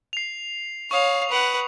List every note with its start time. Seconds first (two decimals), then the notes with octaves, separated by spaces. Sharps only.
0.13 C7 F7
0.91 C#5 F5 C#6 D#6 F7
1.29 B4 F#5